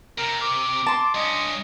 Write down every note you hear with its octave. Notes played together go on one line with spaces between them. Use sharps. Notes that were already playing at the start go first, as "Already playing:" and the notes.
C3 A#4
D6
A5 C6
G2 C#4 D#5